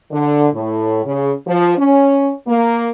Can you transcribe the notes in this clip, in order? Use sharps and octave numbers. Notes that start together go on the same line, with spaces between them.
D3
A2
C#3
F3
C#4
A#3